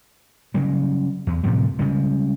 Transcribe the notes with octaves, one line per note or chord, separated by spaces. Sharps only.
C#3 F#3 G3
E2
A2 C3 F3 G3
C#3 G3 G#3